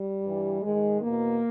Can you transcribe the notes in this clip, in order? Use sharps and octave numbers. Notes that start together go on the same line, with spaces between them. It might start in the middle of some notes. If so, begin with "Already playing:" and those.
Already playing: G3
G2 E3
G#2 D#3 G#3
E2 B2 A#3